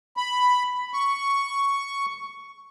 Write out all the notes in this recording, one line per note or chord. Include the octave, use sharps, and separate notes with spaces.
B5
C#6